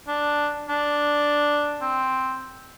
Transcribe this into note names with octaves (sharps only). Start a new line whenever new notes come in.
D4
D4
C4